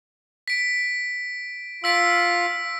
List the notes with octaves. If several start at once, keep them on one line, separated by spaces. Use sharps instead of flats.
B6 D7
F4 F5 E6 B6 D7